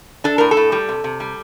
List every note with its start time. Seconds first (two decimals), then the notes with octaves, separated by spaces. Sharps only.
0.24 D4 A4
0.38 A2 A#4
0.51 A4
0.57 A2
0.72 G3
0.89 C3
1.04 C3
1.20 G3